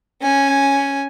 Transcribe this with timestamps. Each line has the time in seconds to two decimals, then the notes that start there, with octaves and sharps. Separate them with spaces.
0.22 C#4 G#5